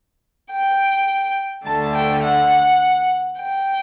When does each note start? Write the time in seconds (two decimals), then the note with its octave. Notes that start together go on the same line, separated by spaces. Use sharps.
0.52 G5
1.66 D2 D3 A3 A5
1.95 G5
2.24 F#5
3.40 G5